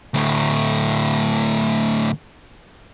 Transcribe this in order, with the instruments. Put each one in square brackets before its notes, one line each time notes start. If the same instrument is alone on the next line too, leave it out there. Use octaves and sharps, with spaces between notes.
[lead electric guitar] D2 A2